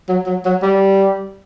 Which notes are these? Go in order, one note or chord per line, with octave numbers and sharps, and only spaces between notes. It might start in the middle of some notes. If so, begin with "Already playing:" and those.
F#3
F#3
F#3
G3